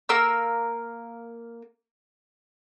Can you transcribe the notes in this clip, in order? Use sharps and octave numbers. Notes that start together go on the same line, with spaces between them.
A#3 A#4 E6